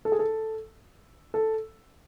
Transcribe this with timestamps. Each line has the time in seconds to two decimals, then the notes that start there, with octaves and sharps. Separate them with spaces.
0.05 A4
0.12 G#4
0.19 A4
1.34 A4